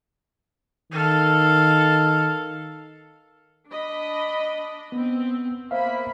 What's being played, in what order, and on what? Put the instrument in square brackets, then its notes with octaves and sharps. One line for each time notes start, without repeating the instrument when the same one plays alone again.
[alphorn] D#3 [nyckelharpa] A4 F5
[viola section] D4 D#5 B5
[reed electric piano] B3 [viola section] C4
[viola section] A#3 B5 [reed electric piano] C5 E5 F5